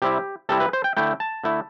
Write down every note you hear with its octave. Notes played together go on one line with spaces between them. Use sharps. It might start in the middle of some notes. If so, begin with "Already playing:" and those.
C3 G3 C4 E4 G4
C3 G3 C4 E4 A4
B4
C5
G5
D3 A3 E4 G5
A5
D3 A3 E4